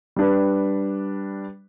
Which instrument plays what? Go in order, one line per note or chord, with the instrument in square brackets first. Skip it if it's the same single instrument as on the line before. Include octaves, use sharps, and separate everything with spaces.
[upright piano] G3 D4 B4